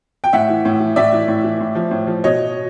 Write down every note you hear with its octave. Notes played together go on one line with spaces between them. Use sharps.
G5
A2 E5 F#5
E3
A2
E3
A2 D5 E5
E3
A2
E3
A2
F3
A2
F3
B2 C#5 D#5